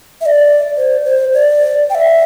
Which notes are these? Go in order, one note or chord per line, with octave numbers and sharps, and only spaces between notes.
E5
D5
C5
C5
D5
G5
E5